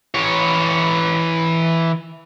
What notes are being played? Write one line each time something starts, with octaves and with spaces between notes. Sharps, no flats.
E3 C#5